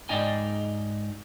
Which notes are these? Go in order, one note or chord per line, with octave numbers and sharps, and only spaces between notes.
G#2 D#4 D5 D#5 G5 G#5